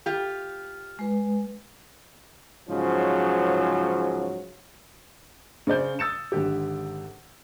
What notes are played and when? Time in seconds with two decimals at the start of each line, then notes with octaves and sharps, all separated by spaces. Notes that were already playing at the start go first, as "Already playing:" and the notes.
0.06 F4 G4
0.99 G#3 B4
2.69 G#2 C#3 F3 F#3
5.67 C#3 C5 D5 G6
5.99 D#6 E6 A6 C#7 E7
6.32 G#1 D3 G4